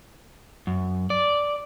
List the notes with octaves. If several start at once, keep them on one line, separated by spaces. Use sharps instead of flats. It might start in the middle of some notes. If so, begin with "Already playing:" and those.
F#2
D5